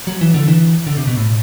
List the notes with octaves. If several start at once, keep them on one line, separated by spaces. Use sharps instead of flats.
F#3
E3
D3
E3
D3
C3
B2
A2